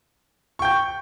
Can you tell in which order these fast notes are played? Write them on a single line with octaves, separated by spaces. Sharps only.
C#6 G5 G6